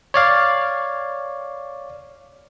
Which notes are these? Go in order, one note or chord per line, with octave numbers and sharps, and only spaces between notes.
C#5 D5 F5